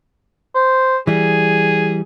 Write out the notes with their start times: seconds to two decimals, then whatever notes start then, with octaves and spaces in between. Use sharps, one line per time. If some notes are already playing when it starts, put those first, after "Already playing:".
0.55 C5
1.07 E3 G3 G#4